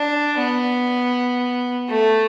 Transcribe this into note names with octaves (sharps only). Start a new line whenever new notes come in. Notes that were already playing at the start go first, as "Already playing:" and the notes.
Already playing: D4
B3
A3